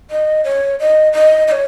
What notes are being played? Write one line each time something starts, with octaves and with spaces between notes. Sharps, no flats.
D#5
C#5
D#5
D#5
D#5
C#5